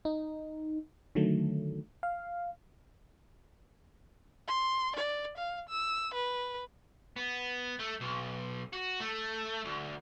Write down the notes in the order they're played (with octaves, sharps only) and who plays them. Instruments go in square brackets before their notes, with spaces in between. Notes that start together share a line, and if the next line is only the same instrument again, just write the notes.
[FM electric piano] D#4
D3 D#3 F#3 A3
F5
[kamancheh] C6
D5
F5
E6
B4
[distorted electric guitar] B3
A3
B1
F#4
A3
D2